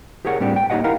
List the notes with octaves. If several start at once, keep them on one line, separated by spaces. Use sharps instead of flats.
G4 G#4 A#4 C#5 F#5
A2 G3 C4 D4 G4
G5
A#3 D#4 G4 C#5 D#5 F#5
E4 G4 A#4 F5 F#5 A#5